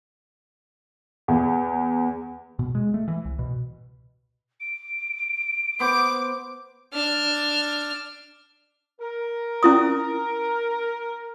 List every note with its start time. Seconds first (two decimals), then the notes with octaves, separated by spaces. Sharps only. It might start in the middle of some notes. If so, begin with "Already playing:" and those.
1.28 E2
2.59 B2
2.75 G#3
2.94 A3
3.08 E3
3.25 C2
3.39 B2
4.60 D7
5.80 B3 C5 D6
6.93 D4 F6
9.01 A#4
9.63 C#4 E4 D#6